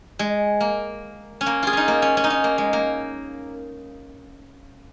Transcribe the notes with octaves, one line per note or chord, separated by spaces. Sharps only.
G#3
A#3
C#4
A#3
F4 G#4
C#4 D#4
A#3
C#4
C#4
D#4
C#4
A#3
G#3
A#3